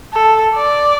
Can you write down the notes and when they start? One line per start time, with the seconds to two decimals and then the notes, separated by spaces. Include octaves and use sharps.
0.13 A4
0.55 D5